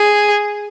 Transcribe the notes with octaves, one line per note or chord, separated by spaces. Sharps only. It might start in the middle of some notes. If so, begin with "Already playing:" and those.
Already playing: G#4